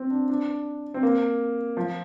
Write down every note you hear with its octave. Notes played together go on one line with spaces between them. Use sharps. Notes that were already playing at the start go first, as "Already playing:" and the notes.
Already playing: C4
D4
D4
C4
A#3
F3